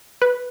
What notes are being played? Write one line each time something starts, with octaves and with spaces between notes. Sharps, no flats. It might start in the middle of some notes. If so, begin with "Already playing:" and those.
B4